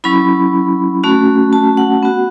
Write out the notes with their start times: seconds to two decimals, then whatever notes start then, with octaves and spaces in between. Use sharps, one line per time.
0.04 F#3 C#4 E4 B5
1.03 A3 C#4 F#4
1.53 A5
1.77 F#5
2.03 B3 F#4